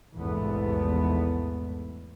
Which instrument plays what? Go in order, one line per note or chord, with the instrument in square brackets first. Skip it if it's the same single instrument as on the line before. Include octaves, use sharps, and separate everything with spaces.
[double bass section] A#1 E2 G#2 C3 A3 B3